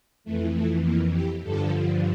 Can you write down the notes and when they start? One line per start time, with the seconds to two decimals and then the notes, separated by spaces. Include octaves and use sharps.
0.24 F2 E3 A3
0.54 A3
0.83 A#3
1.12 G4
1.42 G2 D3 F3 A4